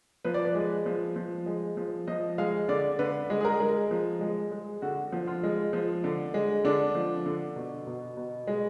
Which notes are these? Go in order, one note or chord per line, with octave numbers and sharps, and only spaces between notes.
F3 B4
D5
B4
G#3
F3
F3
G#3
F3
F3 D#5
G#3 F5
D3 D5
D3 B4
G#3
G#4
A#4
G#3
F3
G#3
G#3
D3 F#4
F3
F4
G#3
F3
D3
G#3
D3 D4
F3
D3
B2
B2
B2
G#3